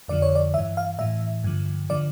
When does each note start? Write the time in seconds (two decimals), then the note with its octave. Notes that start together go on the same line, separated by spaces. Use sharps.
0.08 F2 D3 F3 D5
0.22 C#5
0.35 D5
0.54 E3 E5
0.58 G2
0.77 F5
0.99 A2 E3 E5
1.44 G2 D3 F3
1.89 D3 F3 D5